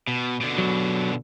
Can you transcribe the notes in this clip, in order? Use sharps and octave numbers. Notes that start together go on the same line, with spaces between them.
B2
B2 D3
F#3